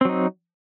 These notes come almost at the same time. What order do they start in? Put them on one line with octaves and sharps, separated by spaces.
C4 F#3 D#4